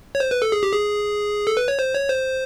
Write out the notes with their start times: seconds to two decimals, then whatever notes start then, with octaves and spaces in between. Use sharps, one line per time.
0.15 C#5
0.20 C5
0.31 B4
0.42 A4
0.52 G#4
0.63 G4
0.73 G#4
1.47 A4
1.57 B4
1.68 C#5
1.79 C5
1.94 C#5
2.10 C5